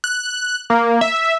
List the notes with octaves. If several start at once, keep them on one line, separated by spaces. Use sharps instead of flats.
F#6
A#3
E5